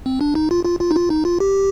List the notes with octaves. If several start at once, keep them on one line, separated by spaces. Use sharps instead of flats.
C4
D4
D#4
F4
F4
F4
D#4
F4
D#4
F4
G4